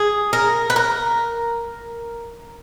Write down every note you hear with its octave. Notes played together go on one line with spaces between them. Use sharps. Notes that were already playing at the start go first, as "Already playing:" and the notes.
Already playing: G#4
A#4
B4
A#4